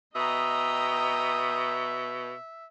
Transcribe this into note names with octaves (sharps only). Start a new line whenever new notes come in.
B2 D#5 E5 G5 A#5 D#6